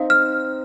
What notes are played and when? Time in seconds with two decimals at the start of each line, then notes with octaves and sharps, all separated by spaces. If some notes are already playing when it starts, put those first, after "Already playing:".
Already playing: C4 D#4 F5
0.10 F6